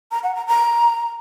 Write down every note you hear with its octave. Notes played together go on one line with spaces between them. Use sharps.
A#5
F#5
A#5
A#5